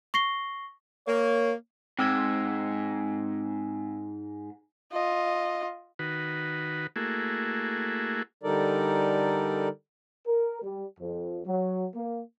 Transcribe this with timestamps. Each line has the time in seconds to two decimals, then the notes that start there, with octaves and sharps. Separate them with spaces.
0.14 C#6 A#6 C7 G7
1.07 A#3 C#5
1.99 G#2 C4 E6 G#6
4.92 F4 D#5
5.99 D#3 F#4 B4
6.96 A3 A#3 E4 F#4 G#4
8.43 D3 G3 D#4 A4 A#4 D5
10.27 A#4
10.62 G3
10.99 F2
11.46 F#3
11.95 A#3